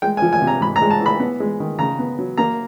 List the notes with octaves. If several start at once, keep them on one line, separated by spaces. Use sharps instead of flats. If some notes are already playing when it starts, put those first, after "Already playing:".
G#3 G5
G#5
F3
G#5
C3
A#5
G#2 B5
A#5
G#3
A5
E3
B5
B3
G#3
D#3
C#3 A#5
B3
F#3
A#3 A#5